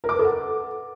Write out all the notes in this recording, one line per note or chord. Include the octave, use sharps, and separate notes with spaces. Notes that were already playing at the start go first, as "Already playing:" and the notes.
A#4
D6
B4
A4
F#5